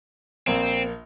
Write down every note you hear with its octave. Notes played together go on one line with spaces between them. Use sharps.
A#1 A#3 C4